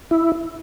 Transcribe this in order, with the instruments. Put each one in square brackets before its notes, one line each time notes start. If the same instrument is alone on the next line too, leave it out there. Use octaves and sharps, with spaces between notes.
[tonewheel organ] E4